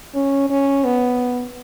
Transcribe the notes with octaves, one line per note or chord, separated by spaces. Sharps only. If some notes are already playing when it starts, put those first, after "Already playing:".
C#4
C#4
B3